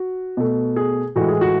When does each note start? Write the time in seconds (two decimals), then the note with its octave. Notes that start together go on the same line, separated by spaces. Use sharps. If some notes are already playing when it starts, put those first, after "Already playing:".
Already playing: F#4
0.37 B2 A3
0.76 G#4
1.15 A2 E3 G#3 F#4
1.28 G#4
1.41 F#4